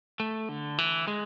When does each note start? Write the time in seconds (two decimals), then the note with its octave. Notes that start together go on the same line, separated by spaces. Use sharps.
0.20 A3
0.49 D3
0.78 E3
1.08 G#3